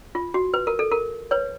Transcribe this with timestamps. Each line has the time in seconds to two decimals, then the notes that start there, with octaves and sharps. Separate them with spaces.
0.15 F4
0.34 F#4
0.54 B4
0.67 A#4
0.79 A4
0.91 A#4
1.31 B4 C#5